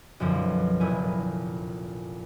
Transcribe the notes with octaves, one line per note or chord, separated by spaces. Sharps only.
B1 F#2 D3 F3
F1 A#1 E4 G#5